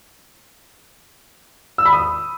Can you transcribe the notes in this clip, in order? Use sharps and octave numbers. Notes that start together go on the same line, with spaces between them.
E6
B5
D#6